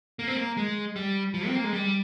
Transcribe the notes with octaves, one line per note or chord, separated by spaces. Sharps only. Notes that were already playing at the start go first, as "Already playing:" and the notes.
A#3
C4
A#3
G#3
G3
F3
C4
A#3
G#3
G3